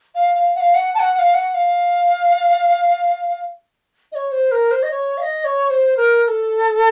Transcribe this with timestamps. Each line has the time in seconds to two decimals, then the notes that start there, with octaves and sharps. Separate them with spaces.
0.14 F5
0.35 F5
0.55 F#5
0.59 F5
0.74 F#5
0.94 A5
0.99 F#5
1.14 F#5
1.18 F5
1.34 F#5
1.54 F5
4.12 D#5
4.15 C#5
4.31 C5
4.51 A#4
4.71 C5
4.82 D#5
4.90 C#5
5.17 F5
5.22 D#5
5.44 C#5
5.70 C5
5.97 A#4
6.23 A#4
6.27 A4